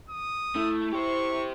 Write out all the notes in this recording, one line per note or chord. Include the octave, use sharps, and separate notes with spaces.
D#6
A3 E4
G4 C5 C#6